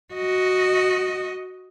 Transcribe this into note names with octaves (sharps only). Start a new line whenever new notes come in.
F#4 D#5